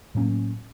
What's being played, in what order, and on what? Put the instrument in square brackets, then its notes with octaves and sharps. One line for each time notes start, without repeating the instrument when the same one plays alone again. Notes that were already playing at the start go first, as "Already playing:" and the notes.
[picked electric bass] A2 F#3 A#3 C#4